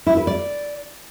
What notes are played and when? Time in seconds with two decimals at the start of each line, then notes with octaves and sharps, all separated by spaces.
0.07 E4
0.17 B4
0.27 D5